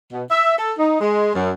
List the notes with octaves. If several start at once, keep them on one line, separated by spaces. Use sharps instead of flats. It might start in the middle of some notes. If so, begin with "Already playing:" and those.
B2
E5
A4
D#4
G#3
F#2